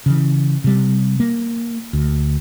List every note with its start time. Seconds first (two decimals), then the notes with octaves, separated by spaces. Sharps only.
0.06 C#3 E3
0.64 C3 G3
1.20 A#3
1.93 D2